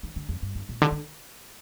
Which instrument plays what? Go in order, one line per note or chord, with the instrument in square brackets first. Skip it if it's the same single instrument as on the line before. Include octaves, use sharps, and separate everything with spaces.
[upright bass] D#3
D3
F2
G2
G2
A#2
D3
D3